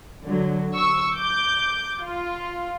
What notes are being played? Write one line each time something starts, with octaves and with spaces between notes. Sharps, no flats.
D3 F#3
C#6 E6
D6 G6
F4